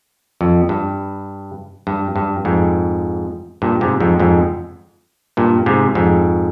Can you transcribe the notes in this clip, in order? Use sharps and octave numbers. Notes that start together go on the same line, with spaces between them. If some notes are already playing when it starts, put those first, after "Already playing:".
F2
G2
G2
G2
F2 G#2
G2 A#2
G#2 C3
F2 G#2
F2 G#2
G2 A#2
G#2 C3
F2 G#2